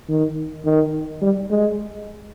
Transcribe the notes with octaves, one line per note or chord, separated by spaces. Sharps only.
D#3
D#3
G3
G#3